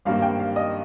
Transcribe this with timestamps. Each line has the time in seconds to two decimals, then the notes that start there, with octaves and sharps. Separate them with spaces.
0.05 G#1 G2 G3 A#3 F5
0.22 G5
0.40 F5
0.56 D#5